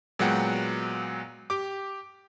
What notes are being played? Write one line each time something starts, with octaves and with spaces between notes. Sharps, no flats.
A#2 F#3 G#3 B3 F#5 G5
G4 G5 D6